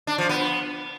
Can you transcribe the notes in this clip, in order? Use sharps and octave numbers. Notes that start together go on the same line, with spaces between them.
D4
F3
B3